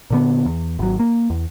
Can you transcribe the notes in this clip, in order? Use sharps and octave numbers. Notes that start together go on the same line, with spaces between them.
A#2 D3 B3
E2
G#1 F#3
A#3
E2